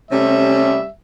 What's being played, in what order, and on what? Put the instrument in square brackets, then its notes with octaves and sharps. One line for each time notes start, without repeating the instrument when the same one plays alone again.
[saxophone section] C3 A3 C#4 [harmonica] G3 E5